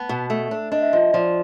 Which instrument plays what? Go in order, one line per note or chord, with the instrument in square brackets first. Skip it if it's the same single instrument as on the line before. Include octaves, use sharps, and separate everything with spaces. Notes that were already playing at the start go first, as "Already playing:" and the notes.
Already playing: [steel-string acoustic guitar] B3 [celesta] A5 B5
[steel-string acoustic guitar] B2
[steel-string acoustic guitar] A3 [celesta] E5
[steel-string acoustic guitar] D4
[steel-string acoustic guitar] D4 [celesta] D#5
[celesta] E5
[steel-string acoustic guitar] F3 [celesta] D#5
[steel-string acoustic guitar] F3 [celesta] D5